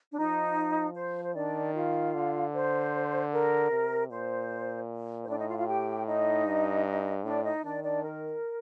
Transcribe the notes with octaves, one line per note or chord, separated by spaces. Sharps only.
D4
F3 D#4
C5
C5
D#3 D4 D5
F4 F5
D3
C5
A#4
C3
A#2 C5
C5
A2 D4 D5
D#4 D#5
F4 F5
F4 F5
G4 G5
D#4 D#5
G2
A2 D4 D5
D#4 D#5
D#3 D4 D5
D4 D5
A#4